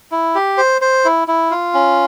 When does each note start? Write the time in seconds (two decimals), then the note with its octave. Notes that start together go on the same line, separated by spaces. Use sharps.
0.12 E4
0.35 G4
0.58 C5
0.81 C5
1.05 E4
1.28 E4
1.51 F4
1.74 C#4